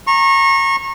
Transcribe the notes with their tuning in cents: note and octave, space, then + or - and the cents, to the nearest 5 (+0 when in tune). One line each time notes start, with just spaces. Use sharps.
A#5 -10 C#6 -30